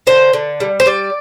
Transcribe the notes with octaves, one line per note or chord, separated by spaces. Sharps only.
D3 C5
D3
G3
C5
G3 D5